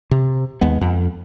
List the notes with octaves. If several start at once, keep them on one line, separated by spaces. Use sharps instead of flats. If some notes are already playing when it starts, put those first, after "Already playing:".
C3
D#2 G#3 B3
F2